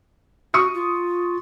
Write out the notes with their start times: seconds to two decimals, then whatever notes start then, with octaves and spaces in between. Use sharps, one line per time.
0.54 F#4 C#6 D#6 C#7
0.74 F4